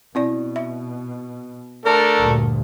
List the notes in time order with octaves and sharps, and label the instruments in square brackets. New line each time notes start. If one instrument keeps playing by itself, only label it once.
[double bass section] B2 [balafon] C4 E4 D5
[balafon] E5
[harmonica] A3 D4 A4 [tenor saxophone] A#4
[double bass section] D2 G2 A#2